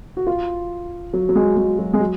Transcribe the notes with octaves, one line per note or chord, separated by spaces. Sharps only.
F#4
F4
F#3
F#3
G#3
G#3
F#3
G#3
F#3